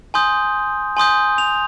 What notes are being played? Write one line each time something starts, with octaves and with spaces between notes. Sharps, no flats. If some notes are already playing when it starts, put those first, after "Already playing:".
G#5 C6 D#6 G6
G#5 C6 D#6 G6
F7